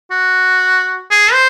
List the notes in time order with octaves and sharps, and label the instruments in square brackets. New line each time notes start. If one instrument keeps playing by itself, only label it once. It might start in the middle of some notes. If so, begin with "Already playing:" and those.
[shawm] F#4
G#4
C5